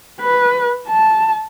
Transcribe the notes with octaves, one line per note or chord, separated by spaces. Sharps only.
B4
A5